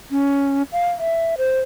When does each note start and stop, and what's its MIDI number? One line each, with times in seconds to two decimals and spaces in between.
0.11 0.63 61
0.72 0.88 77
0.99 1.35 76
1.38 1.60 72